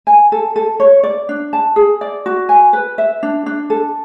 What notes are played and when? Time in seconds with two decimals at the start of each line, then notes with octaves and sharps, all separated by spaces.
0.07 G#5
0.32 A4
0.56 A4
0.80 C#5
1.03 D5
1.29 D4
1.53 A5
1.76 G#4
2.01 D5
2.26 F#4
2.49 G#5
2.73 B4
2.98 E5
3.23 D4
3.46 D4
3.70 A4